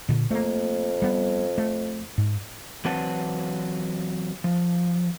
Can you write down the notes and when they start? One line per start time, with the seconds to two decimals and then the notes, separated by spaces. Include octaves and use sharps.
0.09 A#2 D3
0.31 F2 A3 A#3
1.02 G3 B3
1.58 A3
2.18 G#2
2.85 E3 F#3 C4 B4 F#5 A5
4.44 F3